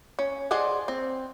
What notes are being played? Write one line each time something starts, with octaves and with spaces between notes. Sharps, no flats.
C#4
G#4 C5 D5 D#5 F#5
C4